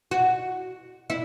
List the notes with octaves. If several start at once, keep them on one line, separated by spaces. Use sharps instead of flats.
F#4
E4